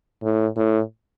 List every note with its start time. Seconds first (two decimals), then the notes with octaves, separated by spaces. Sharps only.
0.23 A2
0.57 A2